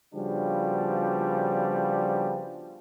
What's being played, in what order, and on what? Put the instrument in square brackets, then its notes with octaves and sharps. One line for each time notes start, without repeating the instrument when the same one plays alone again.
[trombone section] C#3 F3 G3 B3 D4 F#4